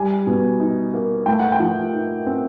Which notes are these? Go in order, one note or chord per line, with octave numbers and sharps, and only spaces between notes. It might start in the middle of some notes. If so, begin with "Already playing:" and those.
Already playing: G3 G#5
B2
D#4
A#3
A3 G5
F#5
G5
F3
D#4
C4